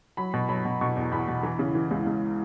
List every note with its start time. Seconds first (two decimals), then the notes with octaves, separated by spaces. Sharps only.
0.17 F#3 B5
0.34 B2
0.49 F#3 B5
0.65 B2
0.81 B2 C#6
0.96 E2
1.11 E2 B5
1.28 B2
1.43 E3
1.59 C#3
1.75 E3
1.91 C#2
2.06 C#2